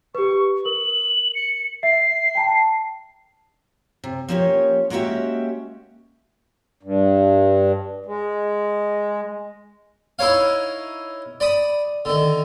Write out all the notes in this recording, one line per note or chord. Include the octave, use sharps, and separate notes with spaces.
G4 B4 C#6
A#4 F#7
C#7
E5 C7
G5 A5 A#5
C3
F3 A#3 C#4 G4 C#5
G#3 A#3 C#4 F#4 G4 E5
G2
G#3
D#4 E4 A#4 C#5 F5
D5 B5 D#6
D3 D#3